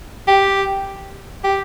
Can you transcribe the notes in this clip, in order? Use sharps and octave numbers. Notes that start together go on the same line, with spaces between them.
G4
G4